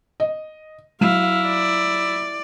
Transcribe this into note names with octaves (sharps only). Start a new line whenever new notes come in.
D#5
F#3 E4 F5
D5